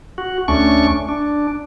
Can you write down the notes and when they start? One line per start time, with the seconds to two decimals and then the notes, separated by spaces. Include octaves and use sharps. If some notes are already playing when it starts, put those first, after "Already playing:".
0.18 F#4
0.48 D2 A3 C#4 D4 C#6
1.09 D4